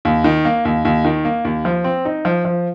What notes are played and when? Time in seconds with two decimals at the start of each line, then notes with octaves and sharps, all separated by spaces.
0.05 D#2
0.24 D#3
0.45 A#3
0.65 D#2
0.85 D#2
1.05 D#3
1.25 A#3
1.45 D#2
1.65 F3
1.84 C4
2.05 D#4
2.25 F3
2.45 F3